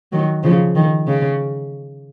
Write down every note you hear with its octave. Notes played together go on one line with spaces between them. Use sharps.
D#3 F#3
C#3 F3
D#3
C#3